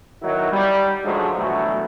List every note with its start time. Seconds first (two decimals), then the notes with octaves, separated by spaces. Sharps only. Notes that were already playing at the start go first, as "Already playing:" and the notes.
0.22 D#3 F#3 B3 D#4 E4 F#4
0.52 G3
1.04 G#2 D3 F3 F#3 G#3 A3
1.37 B2 D3 E3 F#3 A3 F#4